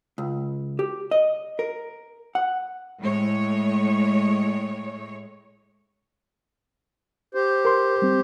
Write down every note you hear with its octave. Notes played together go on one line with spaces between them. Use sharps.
C#2
G4
D#5
A#4
F#5
A2 G#3 C#5
G4 C5
A#4 C6
G3 C4